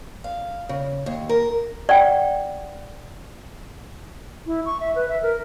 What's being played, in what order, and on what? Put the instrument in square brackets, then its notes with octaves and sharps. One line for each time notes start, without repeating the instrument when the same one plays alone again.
[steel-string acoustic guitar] F5
C#3
D#2
A#4
[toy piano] D5 F#5 G5
[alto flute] E4
C#6
E5
B4
E5
A#4